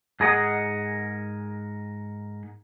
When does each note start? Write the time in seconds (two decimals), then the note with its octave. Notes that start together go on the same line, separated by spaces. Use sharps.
0.20 G#2 G#4 A#4 D#5 F#5